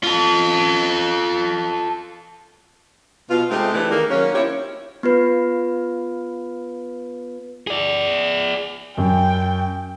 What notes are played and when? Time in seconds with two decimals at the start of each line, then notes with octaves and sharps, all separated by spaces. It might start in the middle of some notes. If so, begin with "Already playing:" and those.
0.04 F4 A4
3.29 B2 F4
3.50 C3 G#3 A3 C4 D#4 G4
3.74 C#3 E3 A3 D4 G#4 A4
3.90 D#3 A#3 G#4
4.10 D#3 F#3 A#3 C#4
4.33 C4 D#4 E4 G4 C#5
5.03 B3 F4 B4
7.67 G#4 D5
8.97 F#2 G5